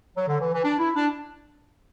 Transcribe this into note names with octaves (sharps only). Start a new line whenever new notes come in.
F#3
D3
E3
E3
D4
E4
D4